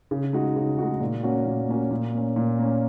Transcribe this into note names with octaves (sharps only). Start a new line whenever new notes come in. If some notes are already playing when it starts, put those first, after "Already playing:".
C#3
G#3 D#4 F#4
C#3
G#3 D#4 F#4
A#2
A#3 C#4 F#4
A#2
A#3 C#4 F#4
A#2
A#3 C#4
A#2
A#3 C#4